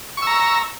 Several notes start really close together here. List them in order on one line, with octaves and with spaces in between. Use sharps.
C#6 E6 A#5